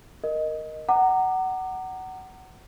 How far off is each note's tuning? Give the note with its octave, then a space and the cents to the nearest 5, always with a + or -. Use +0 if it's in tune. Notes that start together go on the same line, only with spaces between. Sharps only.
A#4 +0 D#5 +0
F#5 +20 A#5 -20 D6 +30